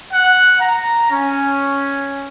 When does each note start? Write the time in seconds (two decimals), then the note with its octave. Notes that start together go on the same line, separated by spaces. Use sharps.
0.13 F#5
0.62 A#5
1.11 C#4